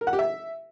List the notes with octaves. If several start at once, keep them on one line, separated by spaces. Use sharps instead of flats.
A#4
F#5
G4
E5